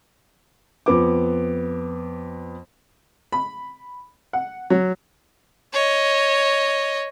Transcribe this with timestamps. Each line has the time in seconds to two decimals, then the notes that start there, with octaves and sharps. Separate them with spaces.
0.86 F2 B3 D6
3.32 B5
4.33 F#5
4.70 F#3
5.73 C#5 D#5